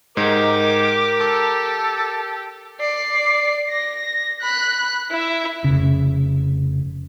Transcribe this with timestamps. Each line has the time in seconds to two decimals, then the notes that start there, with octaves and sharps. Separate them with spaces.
0.17 G#2 D#4 G4 A#4 D6
1.21 A4 D6
2.80 D5 C7
3.70 A#6
4.41 B5 F#6
5.10 E4 E5
5.64 F1 C#3